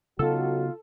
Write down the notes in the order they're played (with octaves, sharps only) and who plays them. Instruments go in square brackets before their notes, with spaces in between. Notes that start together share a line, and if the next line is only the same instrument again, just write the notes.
[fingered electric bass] C#3 B3 [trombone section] F#3 D#4 F#4 [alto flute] F4 [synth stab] A4